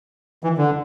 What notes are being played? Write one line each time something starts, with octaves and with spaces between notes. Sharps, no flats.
E3
D3